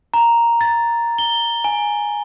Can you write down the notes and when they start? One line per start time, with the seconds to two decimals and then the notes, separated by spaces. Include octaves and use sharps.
0.14 A#5
0.61 A6
1.18 G7
1.64 G#5